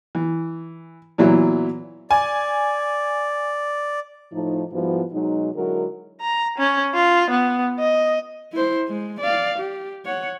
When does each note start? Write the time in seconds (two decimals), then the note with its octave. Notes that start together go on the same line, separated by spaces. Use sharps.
0.15 E3
1.18 A#2 E3 F#3 B3 E4
2.11 D5 G#5
4.33 A2 F3 A3 D#4
4.72 G#2 F3 G3 B3 E4 F#4
5.13 B2 F#3 G#3 D#4
5.55 D3 F#3 G#3 E4 F#4 A#4
6.21 A#5
6.58 C#4
6.94 F4
7.30 B3
7.79 D#5
8.53 E4 C5
8.88 G#3
9.20 D5 F5
9.59 G4
10.06 C#5 F#5